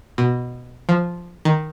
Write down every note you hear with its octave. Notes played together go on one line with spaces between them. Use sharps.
B2
F3
D#3